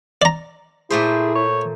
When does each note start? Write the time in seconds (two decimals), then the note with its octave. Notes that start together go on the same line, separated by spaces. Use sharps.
0.22 D5 A#5
0.90 A#2 A3 E4 G#4 C5
1.35 C#5